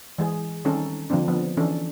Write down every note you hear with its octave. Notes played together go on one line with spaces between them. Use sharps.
E3 G#3 G#4
D#3 G3 C4 C#4 D#4 A4
D3 F3 A#3 C4 D4
F3 B3
E3 C#4 D4 A4